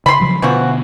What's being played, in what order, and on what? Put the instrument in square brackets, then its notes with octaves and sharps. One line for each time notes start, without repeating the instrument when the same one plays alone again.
[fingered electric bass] C#3 [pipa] B5 C6
[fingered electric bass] C#3 F3 F#3
[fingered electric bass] B2 D3 B3 [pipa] E3 F3 F#4